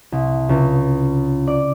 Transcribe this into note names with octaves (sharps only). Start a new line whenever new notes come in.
C2
C#2
D5